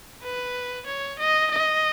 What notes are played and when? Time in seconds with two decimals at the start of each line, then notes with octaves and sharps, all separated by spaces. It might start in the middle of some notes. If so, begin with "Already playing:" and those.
0.23 B4
0.86 C#5
1.19 D#5
1.51 D#5